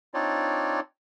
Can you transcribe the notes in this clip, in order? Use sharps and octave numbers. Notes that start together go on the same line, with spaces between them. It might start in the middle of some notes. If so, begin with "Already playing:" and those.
C4 D4 D#4 F4 C#5 D5